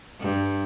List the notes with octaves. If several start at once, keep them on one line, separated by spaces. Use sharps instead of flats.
G2